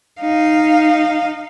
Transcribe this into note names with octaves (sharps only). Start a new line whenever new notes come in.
D#4 F5